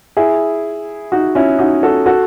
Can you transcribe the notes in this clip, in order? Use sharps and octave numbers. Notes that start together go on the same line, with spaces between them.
E4 G#4
D#4 F#4
C#4 E4
D#4 F#4
F#4 A4
F#4 A4